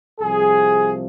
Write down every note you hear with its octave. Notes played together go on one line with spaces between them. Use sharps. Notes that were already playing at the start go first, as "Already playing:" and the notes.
C2 C3 F3 G#4